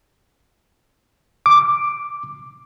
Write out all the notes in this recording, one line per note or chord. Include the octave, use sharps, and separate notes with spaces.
D6